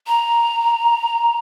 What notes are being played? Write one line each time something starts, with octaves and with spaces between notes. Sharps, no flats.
A#5